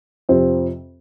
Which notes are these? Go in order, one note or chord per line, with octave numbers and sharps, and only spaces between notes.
F2 C3 F3 C4